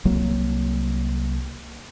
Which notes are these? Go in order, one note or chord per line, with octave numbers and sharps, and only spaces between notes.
C2 F#3 A#3